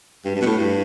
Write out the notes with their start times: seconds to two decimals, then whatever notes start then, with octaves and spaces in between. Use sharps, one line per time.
0.25 G2
0.36 G2
0.41 B2
0.46 A2
0.57 G2